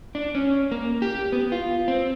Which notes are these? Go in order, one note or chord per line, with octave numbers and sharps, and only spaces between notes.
D4
C#4
A#3
G4
B3
F4
C4